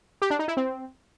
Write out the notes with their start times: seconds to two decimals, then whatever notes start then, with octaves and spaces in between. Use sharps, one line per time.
0.22 G4
0.30 D4
0.39 D#4
0.48 E4
0.57 C4